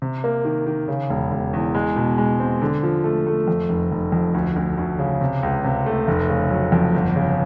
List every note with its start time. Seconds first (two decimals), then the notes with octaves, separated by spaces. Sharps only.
0.02 C3
0.24 A#3
0.45 D#3
0.66 D#3
0.88 C#3
1.10 E1
1.31 E1
1.53 E2
1.75 G#3
1.96 B2
2.18 G#3
2.40 C4
2.62 D3
2.83 F3
3.04 A3
3.27 A3
3.48 F2
3.69 F1
3.92 F1
4.12 F2
4.34 D2
4.56 D2
4.77 D2
4.99 C#3
5.21 C3
5.43 C#2
5.64 C3
5.86 A3
6.08 F1
6.29 C#3
6.51 F#3
6.72 F2
6.94 G1
7.16 C#3